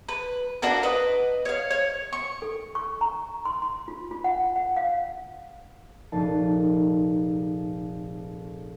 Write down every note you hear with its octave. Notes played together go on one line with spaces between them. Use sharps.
B4
D4 F4 F#4 A#4
B4 D#5
C#5 F5
C#5
C#6
A4
C#6
A#5
C6
C6
F4
F4
F#5
F#5
F5
F1 A#1 D#4 A5 C7